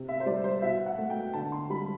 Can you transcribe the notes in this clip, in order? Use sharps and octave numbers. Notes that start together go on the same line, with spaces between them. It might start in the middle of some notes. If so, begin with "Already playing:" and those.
Already playing: C3
E5
C5
G3 D5
C5
B2 E5
F#5
A3
G5
D3 A5
C6
G3 B5